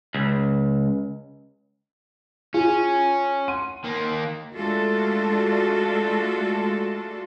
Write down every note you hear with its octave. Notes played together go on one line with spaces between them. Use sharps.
C#2
C#4 F4 G#4
F#5 C6 D#7
D#3 A#3
G#3 A3 D4 F4 F#4 A4